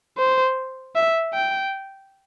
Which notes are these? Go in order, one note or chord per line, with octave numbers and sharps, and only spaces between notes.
C5
E5
G5